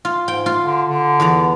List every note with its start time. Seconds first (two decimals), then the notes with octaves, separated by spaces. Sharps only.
0.05 F4
0.28 G#2 G5
0.46 F4
0.61 D3
0.89 D3
1.20 E2 B3 A#5